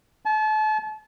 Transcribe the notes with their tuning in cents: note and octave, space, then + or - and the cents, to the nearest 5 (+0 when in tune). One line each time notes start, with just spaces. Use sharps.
A5 -35